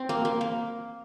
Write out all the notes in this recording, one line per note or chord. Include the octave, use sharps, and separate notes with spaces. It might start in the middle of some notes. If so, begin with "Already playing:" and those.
Already playing: C4
A#3
A#3
A#3